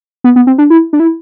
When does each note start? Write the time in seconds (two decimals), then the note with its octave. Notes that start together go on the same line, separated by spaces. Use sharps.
0.24 B3
0.36 B3
0.47 C4
0.58 D4
0.70 E4
0.93 D4
1.00 E4